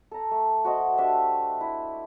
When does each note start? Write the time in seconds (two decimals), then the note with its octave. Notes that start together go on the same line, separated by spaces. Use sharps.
0.11 A4 A#5
0.31 A3
0.65 F#4 C5 D#5
0.98 D4 G4 E5
1.61 E4